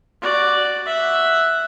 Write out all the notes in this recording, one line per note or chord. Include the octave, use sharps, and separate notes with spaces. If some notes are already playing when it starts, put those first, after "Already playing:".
F#4 D5
E5 F#5